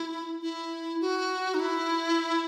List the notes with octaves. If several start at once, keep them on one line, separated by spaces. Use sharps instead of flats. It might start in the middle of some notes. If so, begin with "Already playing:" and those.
Already playing: E4
E4
F#4
D#4
E4